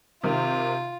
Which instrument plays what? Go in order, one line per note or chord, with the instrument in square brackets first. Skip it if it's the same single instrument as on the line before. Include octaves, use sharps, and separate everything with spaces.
[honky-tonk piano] C3 D#3 [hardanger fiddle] F4